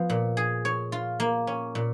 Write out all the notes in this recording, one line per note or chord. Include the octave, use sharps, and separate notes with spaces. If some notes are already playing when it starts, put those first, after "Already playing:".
Already playing: F3 B3
A#2
G#4
C#5
F4
A#3
C#4
A#2